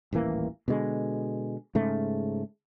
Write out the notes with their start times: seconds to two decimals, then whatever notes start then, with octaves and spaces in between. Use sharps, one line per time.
0.13 D#1 A1 E3 A#3
0.68 B2 D3 G#3
1.75 G#2 C#3 A3